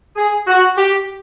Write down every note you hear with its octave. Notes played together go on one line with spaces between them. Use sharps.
G#4
F#4
G4